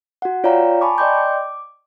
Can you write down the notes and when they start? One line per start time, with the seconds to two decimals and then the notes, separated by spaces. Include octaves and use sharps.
0.22 F#4 F#5
0.44 F4 C#5 D5 F5 G5 A#5
0.81 G#5 A5 B5 C#6 D6
0.98 D5 D#5 G5 C6 D6 G6
1.15 D6